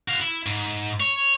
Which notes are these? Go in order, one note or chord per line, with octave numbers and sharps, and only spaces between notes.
F#4 F5
E4
G#2
C#5